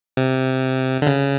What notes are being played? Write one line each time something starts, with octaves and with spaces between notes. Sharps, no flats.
C3
D3
C#3